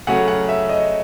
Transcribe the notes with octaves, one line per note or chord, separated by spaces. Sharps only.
C#3 F#3 A3 C#4 F#5
F#5
E5
D#5